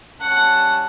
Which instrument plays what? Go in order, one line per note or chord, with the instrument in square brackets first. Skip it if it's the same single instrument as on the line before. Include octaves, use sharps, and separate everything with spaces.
[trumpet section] G3 C#4 A5 [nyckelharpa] F#5